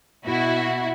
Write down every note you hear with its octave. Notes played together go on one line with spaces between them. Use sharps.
B2 E4 F#4